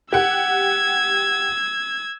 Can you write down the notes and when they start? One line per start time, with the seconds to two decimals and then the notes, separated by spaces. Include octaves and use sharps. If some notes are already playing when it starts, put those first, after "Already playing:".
0.13 G4 F#5 E6 G#6